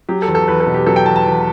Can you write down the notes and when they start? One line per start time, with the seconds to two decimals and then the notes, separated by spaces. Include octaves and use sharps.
0.09 F#3 G4
0.22 A4
0.28 E2
0.35 A4
0.48 E2 B4
0.60 A4
0.67 B2
0.74 G4
0.86 F#3 A4
0.96 G5
1.05 E2 A5
1.16 A5
1.26 E2